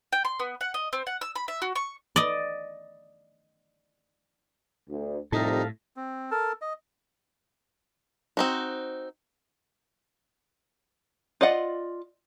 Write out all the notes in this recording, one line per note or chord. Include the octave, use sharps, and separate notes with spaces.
G5
C6
B3
F#5
D#5
C4
F#5
E6
B5
E5
F#4
C#6
D5 D#5
D2
C2 F2 A2 C3 D#4 A4 F5
C4
A4 A#4 A5
D#5
C4 D#4 F#4
F4 D5 D#5 F#5